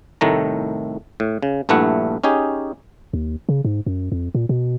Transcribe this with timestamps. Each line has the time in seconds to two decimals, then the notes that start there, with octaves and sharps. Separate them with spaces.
0.21 C2 A2 D#3 A3 A#5
1.20 A2
1.43 C#3
1.69 A#1 G2 A3 E4 F#5
2.24 C#4 D#4 G4 G#4
3.13 D#2
3.49 C#3
3.65 G#2
3.86 F#2
4.12 F2
4.35 A#2
4.49 B2